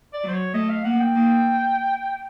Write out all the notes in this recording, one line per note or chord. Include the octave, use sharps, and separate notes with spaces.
D5
F#3 C5
C#5
A3 D#5
F5
A#3 F#5
G5
A#3